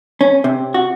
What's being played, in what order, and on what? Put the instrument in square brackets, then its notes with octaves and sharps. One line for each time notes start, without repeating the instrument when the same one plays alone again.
[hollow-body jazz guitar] C#4
C3
F#4